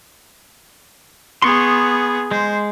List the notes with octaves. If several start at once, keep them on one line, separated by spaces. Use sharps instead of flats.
B3 G#4 C6 C#6
G#3 C5